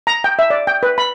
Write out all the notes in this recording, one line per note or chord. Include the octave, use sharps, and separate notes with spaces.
A#5
G5
E5
D5
G5
B4
B5